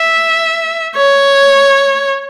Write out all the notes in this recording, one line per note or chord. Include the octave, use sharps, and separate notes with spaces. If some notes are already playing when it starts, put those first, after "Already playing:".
Already playing: E5
C#5